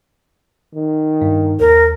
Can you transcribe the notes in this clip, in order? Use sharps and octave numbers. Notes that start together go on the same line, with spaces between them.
D#3
G2
D#2 A#4